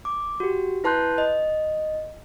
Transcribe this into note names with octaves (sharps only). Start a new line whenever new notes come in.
D6
F#4 G4
E4 B4 A5 C6 F#6 G6
D#5